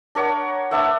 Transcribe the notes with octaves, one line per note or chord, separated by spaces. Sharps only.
D4 A#4 C#5 F#5
D4 B4 E5 F#5